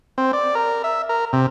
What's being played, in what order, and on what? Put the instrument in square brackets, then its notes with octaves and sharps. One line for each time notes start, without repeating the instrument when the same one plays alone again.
[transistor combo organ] C4
D5
A#4
E5
A#4
C3